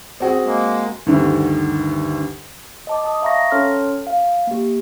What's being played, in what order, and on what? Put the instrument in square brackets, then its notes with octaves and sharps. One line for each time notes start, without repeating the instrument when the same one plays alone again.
[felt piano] C4 F#4 G#4
[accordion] G#3 A#3
[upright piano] D2 G2 D3 D#3
[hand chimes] D#5 A5 D6
D#5 A5 D#6
E5 F5 A#5 C#6 A#6
C#4 A4 C#5 A5 C6 F6
F5
A#3 G4